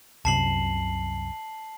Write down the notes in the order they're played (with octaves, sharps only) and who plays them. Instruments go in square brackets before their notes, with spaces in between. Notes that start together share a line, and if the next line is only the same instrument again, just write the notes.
[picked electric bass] C2 F#2 C3 [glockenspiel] A5 C7 F#7